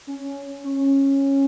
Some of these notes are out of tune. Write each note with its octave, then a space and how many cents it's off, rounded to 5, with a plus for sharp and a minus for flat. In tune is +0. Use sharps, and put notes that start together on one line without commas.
C#4 +10
C#4 -15